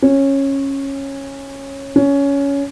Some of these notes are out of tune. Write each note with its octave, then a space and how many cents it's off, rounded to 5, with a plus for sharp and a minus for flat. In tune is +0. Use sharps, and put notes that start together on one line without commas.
C#4 -15
C#4 +15